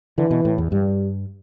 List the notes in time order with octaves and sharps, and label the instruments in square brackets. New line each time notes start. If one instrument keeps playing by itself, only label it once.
[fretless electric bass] D3 [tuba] E3
[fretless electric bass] B2
A2
E2
[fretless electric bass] G2 [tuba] G3